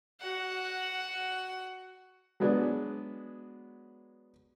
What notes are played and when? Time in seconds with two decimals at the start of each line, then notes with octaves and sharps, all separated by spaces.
0.21 F#4 F#5
2.40 F#3 G#3 B3 D4 G#4